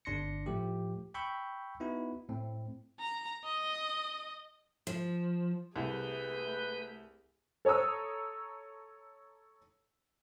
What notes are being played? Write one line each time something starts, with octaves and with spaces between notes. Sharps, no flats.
G1 D4 C6 A#6 C#7
A2 F3 A3 G4
G5 B5 C#6 E6 G6
B3 D#4 E4 F#4
A2 A3 C4
A#5
D#5
F3
C2 A3 G#4 B4 G6
A4 C#5 A#5 D#6 E6